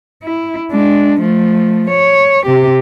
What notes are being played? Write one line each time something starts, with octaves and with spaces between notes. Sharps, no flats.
E4
G#3 D4
F3 A3
C#5
C3 G4